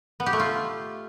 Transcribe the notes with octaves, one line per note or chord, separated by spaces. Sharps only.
B3
G4
A3
F4